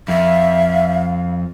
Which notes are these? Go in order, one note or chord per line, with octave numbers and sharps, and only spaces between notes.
F2 E5 F5